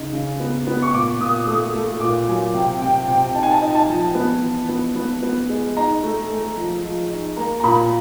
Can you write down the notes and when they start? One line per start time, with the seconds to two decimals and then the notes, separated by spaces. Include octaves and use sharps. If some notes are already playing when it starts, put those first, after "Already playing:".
Already playing: C#3 D#4
0.13 C#3
0.40 B3
0.67 B3
0.82 C#6
0.93 A#2 D6
1.20 A#2 D#6
1.46 A3 D#6
1.74 A3
2.00 A#2 D6
2.27 F#3 G#5
2.54 C3 G5
2.81 C3 G5
3.08 C3 G5
3.34 D#4 A5
3.43 G#5
3.51 A5
3.62 D#4
3.75 A5
3.89 F3
4.15 B3
4.42 E3
4.69 B3
4.95 B3
5.22 B3
5.49 G#3
5.77 D#4 A#5
6.03 A3
6.30 A3
6.57 F3
6.83 F3
7.10 D#4
7.37 A#3 A#5
7.60 A#5
7.63 A#2 B5